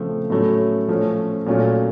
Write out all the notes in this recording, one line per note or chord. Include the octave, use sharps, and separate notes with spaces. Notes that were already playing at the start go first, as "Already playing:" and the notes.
Already playing: C#3 F3 A3 C4
A2 F#3 A3 C#4
F3 A3 C#4
A#2 F#3 A3 C#4 F4